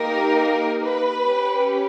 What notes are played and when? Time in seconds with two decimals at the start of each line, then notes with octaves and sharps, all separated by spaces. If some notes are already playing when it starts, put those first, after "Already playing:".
Already playing: A#3 D#4 G4 A#4
0.84 B4
1.21 C#4 G4